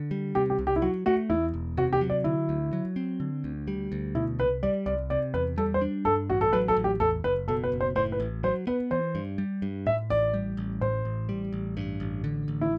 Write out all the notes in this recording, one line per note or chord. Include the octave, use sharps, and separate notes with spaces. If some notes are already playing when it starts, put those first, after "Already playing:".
Already playing: D3
G3
C3 G4
G4
C2
G4
E4
F#3 F#4
A3 F#4
E2 E4
E1
C3 F#4
G4
F#3
D5
D3 E4
D2
F#3
C4
D3
D2
G3
D2
B2 E4
C2 B4
G3 D5
C2 D5
C3 D5
E2 B4
G3 A4
C5
D4
G2 A4
A1 F#4
A4
F#3 B4
A4
A1
G4
E2 A4
F#1 B4
B2 A4
B4
F#1
C5
A2 C5
B4
A1
F#3 C5
B3 B4
E3 C5
G2
G3
G2
A2 E5
A1 D5
G3
A1
A2 C5
A1
G3
A1
G2
A1
D3
A1
E4